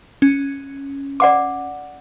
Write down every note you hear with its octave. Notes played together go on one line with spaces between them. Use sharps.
C#4
D5 F#5 D6